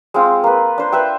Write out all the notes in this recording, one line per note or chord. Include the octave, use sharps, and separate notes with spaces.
G#3 C4 F4
A#3 B4
D4 C5
B4 C5 E5 G5